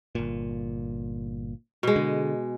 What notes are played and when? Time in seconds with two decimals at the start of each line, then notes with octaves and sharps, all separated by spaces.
0.15 G1 A#2
1.83 B2 G#3
1.96 D3